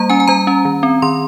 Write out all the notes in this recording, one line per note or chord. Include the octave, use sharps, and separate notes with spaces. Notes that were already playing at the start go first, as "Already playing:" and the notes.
Already playing: G3 A#3 A#5
C#4 G#5
G#5
G3 A#5
C#4
D#3
C4
D#3 C6